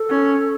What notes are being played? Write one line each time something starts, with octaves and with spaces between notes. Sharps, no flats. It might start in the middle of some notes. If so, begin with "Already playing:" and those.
Already playing: A4
C#4